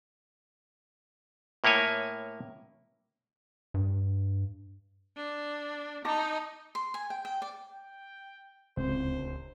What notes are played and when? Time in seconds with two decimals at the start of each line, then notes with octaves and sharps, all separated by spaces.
1.64 A2 A#3 E4 C#5 G#5
3.74 G2
5.16 D4
6.05 D#4 A5 A#5 D6
6.75 C6
6.94 G#5
7.10 G5
7.25 G5
7.42 D5
7.72 G5
8.77 D1 C#2 C4 C5